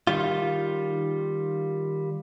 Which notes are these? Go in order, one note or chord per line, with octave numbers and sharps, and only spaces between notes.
D#3 G3 F4